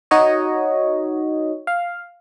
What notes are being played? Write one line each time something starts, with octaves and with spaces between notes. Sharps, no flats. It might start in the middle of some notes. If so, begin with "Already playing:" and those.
D#4 F#4 C#5 D#5
F5